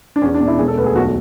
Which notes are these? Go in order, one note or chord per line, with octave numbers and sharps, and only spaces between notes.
D4
E2 C#4
D4
B2
E4
E1 G#4
A4
D2 B4
G#4
B1 F#4